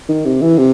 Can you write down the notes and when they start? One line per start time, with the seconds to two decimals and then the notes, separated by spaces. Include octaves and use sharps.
0.09 D#3
0.25 C3
0.41 E3
0.58 C3